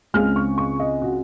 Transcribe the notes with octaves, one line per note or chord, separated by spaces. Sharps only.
C#2 C#3 G#3 C4 F6
C#6
C#6
D#5
F#4